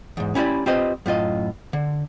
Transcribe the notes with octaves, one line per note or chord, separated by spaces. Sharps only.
E2 G#2
C#4 E4 G4 D5 B5
C4 F4 G4 B4 C5 D#5
F#2 A2 F4 D#5
D3